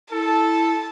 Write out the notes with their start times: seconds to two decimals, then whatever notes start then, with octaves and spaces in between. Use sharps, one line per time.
0.11 E4 A4 A5